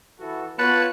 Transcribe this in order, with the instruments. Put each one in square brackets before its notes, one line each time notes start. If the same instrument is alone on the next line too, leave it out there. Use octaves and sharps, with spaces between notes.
[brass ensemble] E3 F#4 A4
[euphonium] B3 [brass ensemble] F4 C#5 [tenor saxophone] B4 [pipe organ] F#5 A5 F#6